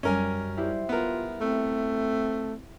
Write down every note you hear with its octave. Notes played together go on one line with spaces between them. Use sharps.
F#2 G3 C#4 A#4 G#5
G3 E4 G4 C5
B3 F4 A#4
A3 C4